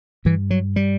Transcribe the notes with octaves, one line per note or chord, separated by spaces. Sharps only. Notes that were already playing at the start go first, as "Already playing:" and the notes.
G2 E3
F#3
G3